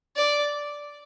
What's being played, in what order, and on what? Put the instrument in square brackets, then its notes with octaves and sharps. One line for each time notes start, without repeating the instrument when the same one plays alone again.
[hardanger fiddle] D5